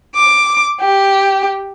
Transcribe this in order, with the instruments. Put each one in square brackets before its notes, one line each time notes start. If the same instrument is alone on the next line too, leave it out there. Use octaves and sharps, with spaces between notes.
[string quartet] D6
G4